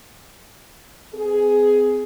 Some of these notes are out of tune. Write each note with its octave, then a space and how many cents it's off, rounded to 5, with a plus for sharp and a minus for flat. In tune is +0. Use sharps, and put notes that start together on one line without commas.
C4 -40 G#4 +10